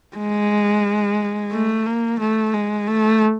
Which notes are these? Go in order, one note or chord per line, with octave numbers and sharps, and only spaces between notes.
G#3
A3
A#3
A3
G#3
A3